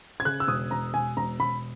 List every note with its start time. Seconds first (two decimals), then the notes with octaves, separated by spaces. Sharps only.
0.20 G#6
0.25 C#3 F#6
0.40 E6
0.48 E1 D#6
0.71 E1 A#5
0.94 E1 G#5
1.17 E1 A#5
1.39 E1 B5